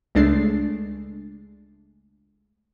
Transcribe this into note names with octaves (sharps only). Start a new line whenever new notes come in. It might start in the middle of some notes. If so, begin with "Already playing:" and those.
C#2 G#3 A3 D4 A6 C7